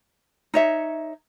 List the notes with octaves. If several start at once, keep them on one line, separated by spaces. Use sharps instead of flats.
D#4 C#5 E5